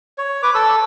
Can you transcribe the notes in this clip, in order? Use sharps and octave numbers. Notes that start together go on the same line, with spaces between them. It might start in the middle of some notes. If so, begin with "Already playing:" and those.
C#5
B4 D6
A4 E6